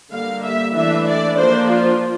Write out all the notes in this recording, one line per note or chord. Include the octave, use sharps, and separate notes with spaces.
D3 G3 A#3 F5
E5
E3 A3 D4 E5
D5
F3 A#3 D4 C5
F4